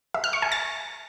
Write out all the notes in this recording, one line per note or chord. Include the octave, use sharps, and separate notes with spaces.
E5
F6
C#6
G#5
A6